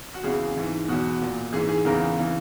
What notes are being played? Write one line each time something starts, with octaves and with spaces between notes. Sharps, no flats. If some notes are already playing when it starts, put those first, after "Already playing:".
F#4
E2 C#3 E3 G#4
G#2 E3
E2 B2 F#4
A#2
G#2 E3 G#4
G#4
E2 C#3 E3 A#4
C#3 E3